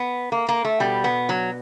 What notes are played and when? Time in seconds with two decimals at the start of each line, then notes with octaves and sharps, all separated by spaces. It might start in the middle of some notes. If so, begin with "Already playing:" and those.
Already playing: B3
0.32 A#3
0.49 A#3
0.65 A3
0.80 B2 G3
1.04 B3
1.29 F#3